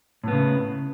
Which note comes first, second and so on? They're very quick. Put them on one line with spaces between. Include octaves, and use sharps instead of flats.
A2 B3 C#3